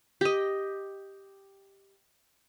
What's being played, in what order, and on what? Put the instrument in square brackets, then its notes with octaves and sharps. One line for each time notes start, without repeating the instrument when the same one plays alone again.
[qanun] G4 D#5